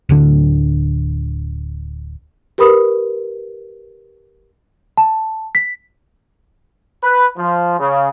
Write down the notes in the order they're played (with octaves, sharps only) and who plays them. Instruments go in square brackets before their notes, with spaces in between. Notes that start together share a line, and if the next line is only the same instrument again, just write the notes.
[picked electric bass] D1 D3
[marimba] G4 A#4 B4 B5 D#6
[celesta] A5
B6
[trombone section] B4
F3
C#3